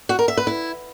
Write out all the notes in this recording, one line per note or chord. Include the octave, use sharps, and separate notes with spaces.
F#4
A#4
E5
B4
E4